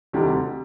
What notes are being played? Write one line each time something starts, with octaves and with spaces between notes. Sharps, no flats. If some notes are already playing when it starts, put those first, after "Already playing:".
D2 C3 D#3 G3